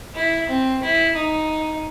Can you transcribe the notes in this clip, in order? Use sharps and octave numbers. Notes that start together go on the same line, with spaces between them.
E4
C4
E4
D#4